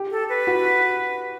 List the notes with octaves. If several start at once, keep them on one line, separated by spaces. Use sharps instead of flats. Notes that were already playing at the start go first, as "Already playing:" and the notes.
Already playing: G4
A4
B4
F#4